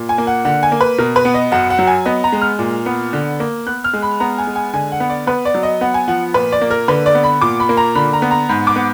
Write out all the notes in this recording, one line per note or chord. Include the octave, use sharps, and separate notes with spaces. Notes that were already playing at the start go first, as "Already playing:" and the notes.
Already playing: A#2
G#5
A#3
F#5
D3 F#5
G#5
A#3
B4
B2 A#4
B4
B3
D#5
F#2 F#5
F#5
F#3
G#5
B3 D#5
A#5
G#3
F6
A#2
B3
D3
A#3
B3 F#6
F6
G#3
B5
B3 A#5
G#5
G#3
G#5
D3 G#5
F#5
B3
D5
B3 B4
D5
F#3
D#5
B3 F#5
G#5
F3 F#5
A#2 B4
D5
A#3
A#4
D3 B4
D5
B3
B5
A#2 D6
B5
A#3
A#5
D3 B5
A#5
B3
A#5
G#2 B5
D6
B3